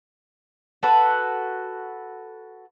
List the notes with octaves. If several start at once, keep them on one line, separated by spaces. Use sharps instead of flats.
F#4 A4 B4